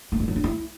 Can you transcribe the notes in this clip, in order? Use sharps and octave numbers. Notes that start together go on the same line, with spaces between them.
A3
G#3
F#3
D4
E4